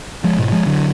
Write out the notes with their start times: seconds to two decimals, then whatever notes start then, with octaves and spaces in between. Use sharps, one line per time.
0.24 F3 G#3
0.38 G#2 B2
0.52 F3 G#3
0.66 D3 F#3